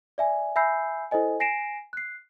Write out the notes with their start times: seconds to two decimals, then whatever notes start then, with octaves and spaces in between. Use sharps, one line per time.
0.18 D5 E5 G#5
0.56 E5 G#5 B5 E6 G6 C7
1.11 E4 A4 C5 D#5 G#5
1.40 G#5 A#6 C7 D7 E7
1.93 F#6 C7